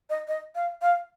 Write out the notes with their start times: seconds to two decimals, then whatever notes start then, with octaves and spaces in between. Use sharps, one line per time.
0.10 D#5
0.28 D#5
0.55 F5
0.82 F5